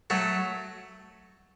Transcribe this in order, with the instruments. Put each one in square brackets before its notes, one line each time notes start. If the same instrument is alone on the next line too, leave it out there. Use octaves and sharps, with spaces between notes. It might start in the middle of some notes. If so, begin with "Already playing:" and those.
[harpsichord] F#3 A3